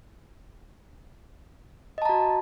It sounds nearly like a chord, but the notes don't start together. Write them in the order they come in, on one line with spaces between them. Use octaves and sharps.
D#5 A5 A#5 F#4